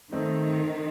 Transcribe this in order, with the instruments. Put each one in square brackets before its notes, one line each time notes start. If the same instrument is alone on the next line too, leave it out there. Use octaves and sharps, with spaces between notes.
[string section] D#3 [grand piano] A3 C4 D#4